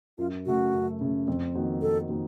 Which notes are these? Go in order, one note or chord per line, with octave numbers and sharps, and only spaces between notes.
F#2 F4
C#3 A3 F#4
F#2
C#3 A3
F2
D#3 A#3 D#4 F#4
F2 A4
D#3 A#3 D#4 F#4